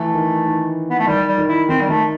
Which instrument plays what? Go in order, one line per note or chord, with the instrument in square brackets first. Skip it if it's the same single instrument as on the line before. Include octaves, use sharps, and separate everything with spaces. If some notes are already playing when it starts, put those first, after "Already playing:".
Already playing: [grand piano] E3 [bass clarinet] A3
[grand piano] D#3
D#3
[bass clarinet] B3
A3
[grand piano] D#3 [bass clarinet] G3
[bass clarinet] G3
[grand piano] D#3
[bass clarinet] E4
[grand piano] D#3 [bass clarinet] C4
[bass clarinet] G3
[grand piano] D#3 [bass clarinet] A3